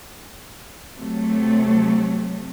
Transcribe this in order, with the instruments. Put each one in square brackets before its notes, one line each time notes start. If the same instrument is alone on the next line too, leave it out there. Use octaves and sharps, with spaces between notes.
[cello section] C3 F#3 A3